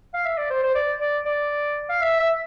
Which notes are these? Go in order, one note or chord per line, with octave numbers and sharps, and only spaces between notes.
F5
E5
D5
C5
C5
D5
D5
D5
F5
E5
E5